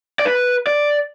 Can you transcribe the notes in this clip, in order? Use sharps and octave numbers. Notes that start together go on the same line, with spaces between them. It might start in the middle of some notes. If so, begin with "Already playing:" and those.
D5
B4
D5